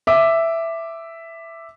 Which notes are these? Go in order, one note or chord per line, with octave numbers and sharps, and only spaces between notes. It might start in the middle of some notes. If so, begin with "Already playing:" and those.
E5 D6